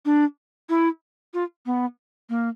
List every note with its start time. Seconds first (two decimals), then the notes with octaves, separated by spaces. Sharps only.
0.05 D4
0.69 E4
1.34 F4
1.66 B3
2.30 A#3